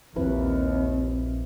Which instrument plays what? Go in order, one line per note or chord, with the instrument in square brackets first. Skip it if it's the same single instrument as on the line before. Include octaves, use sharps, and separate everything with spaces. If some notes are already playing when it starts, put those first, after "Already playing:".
[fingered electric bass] A#1 [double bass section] D#2 [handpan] F3 E4 B4 [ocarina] C4